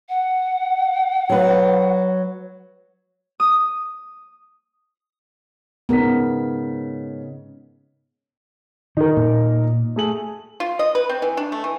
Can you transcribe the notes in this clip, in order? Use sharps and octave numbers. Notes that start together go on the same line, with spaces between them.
F#5
F#3 B4
D#6
G#2 C#3 B3 A#4 B6
D#3 D#4 A#4
A#2
A3 G#4 F#7
F4
D#5
B4
C4
E3
D4
A3
E3